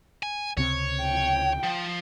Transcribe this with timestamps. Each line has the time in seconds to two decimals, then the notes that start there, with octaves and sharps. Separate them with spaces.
0.23 G#5
0.57 C#2 C3 C4 C#5
1.02 G5
1.63 F3